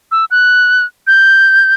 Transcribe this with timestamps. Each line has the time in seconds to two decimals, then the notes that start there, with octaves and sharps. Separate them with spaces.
0.12 E6
0.31 F#6
1.07 G6